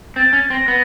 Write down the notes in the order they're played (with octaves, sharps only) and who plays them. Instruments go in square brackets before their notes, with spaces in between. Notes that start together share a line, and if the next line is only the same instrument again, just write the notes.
[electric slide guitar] C4 [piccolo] A6
[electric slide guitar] C#4
[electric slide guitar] C4 [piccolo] A#6
[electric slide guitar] B3